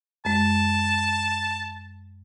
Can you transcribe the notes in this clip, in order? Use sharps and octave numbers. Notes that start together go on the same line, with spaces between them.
F#2 G#3 A5